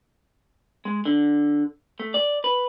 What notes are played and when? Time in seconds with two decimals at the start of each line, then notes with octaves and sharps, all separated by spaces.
0.85 G#3
1.05 D3
2.00 A3
2.14 D5
2.44 B4